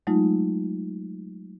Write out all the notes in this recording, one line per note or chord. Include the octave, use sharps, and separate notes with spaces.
F#3 G#3 A3 D#4 F4